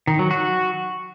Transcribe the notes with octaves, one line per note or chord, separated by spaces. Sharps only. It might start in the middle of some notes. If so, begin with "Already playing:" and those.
D#3
F#3
F#4